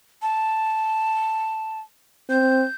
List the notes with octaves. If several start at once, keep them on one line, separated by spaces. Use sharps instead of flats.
A5
C4 G6